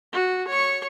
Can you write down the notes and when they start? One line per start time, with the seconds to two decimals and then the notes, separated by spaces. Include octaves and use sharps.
0.13 F#4
0.48 C#5 C#6